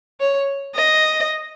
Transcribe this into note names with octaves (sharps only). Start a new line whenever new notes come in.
C#5
D#5